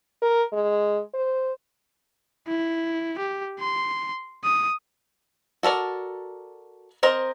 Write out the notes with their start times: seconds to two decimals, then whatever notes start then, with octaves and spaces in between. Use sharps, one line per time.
0.22 A#4
0.53 G#3
1.14 C5
2.47 E4
3.18 G4
3.60 C6
4.44 D#6
5.63 F#4 A4 A#4 D5
7.03 C4 A#4 C5 D#5 A#5